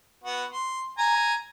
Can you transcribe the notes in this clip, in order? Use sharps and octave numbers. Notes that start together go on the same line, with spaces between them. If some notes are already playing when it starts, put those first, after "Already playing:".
B3 F#4
C6
G#5 A#5